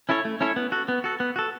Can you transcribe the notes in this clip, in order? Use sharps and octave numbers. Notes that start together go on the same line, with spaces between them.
C#4 E4 A4 C#5
A3
C#4 E4 A4 C#5
B3
F#4 A4
B3
F#4 A4
B3
F#4 A4